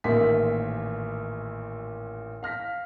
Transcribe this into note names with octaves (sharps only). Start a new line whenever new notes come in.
A1 A#2 D#3 E5 G#5 B6
F5 F6 A#6 B6